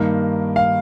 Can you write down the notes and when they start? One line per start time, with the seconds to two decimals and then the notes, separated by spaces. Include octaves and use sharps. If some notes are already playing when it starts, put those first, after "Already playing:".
Already playing: G2 D#3 A#3
0.56 F5